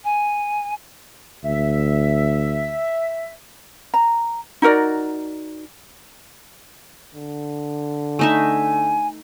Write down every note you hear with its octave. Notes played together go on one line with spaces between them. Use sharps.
G#5
D2 E5
A#5
D#4 F#4 A#4 D5
D3
A3 D#4 E5 G#5